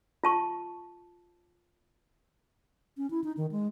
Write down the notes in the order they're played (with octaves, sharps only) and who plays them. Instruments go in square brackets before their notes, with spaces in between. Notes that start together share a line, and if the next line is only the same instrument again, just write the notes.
[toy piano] F4 A5 C#6
[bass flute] C#4
E4
D#4
D#3
G#3